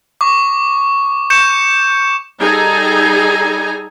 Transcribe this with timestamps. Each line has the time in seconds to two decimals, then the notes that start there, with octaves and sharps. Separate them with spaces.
0.21 C#6 D6
1.30 C#6 G6 C#7 E7
2.41 G3 D#4 G#4 A4 G#5 A#5